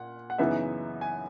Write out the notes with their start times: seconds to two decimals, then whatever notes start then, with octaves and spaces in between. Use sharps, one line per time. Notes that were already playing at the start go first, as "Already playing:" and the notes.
Already playing: A#2 F#5
0.30 F#5
0.38 F#2 C#3 E3 B3 D#4 E5
1.01 G#5